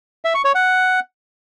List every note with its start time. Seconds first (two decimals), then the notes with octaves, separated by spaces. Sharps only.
0.25 E5
0.35 C#6
0.45 C#5
0.55 F#5